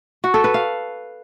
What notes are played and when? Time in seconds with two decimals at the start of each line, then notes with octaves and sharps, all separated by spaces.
0.24 F#4
0.34 A4
0.44 B4
0.54 F5